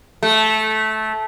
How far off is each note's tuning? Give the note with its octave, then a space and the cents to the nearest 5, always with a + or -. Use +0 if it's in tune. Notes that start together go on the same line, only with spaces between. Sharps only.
A3 -15